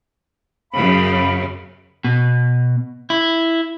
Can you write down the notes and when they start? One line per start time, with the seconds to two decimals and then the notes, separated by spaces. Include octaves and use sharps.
0.73 F#2 C#3 F5 B5
2.04 B2
3.10 E4